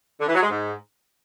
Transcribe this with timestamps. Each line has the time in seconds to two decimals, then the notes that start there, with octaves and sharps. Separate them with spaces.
0.19 D3
0.27 E3
0.34 F#3
0.42 G#3
0.49 G#2